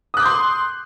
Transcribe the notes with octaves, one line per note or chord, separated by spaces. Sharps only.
C6 D6 D#6 F#6 G6